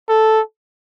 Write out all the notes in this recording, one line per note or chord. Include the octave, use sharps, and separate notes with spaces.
A4